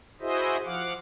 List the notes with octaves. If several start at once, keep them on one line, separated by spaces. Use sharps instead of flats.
E4 F#4 G#4 C5 D#5 E5
F3 F5 F#5 D6